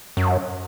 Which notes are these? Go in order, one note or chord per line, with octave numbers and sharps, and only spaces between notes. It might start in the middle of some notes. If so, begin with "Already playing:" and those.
F#2